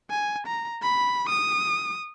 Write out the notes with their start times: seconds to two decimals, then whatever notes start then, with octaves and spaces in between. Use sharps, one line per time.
0.10 G#5
0.47 A#5
0.82 B5
1.29 D#6